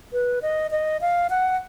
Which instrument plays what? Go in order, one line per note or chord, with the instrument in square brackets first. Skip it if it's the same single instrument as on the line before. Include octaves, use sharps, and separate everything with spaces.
[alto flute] B4
D#5
D#5
F5
F#5